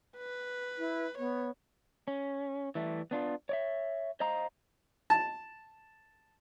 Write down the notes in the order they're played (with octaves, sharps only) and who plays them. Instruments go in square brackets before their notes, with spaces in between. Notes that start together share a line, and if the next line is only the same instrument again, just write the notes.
[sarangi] B4
[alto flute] E4
[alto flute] B3 [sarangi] C#5
[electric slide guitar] C#4
E3 G3 A3
B3 D4 F4
C#5 D5 E5
C5 D#5 F5 A#5
[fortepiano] A5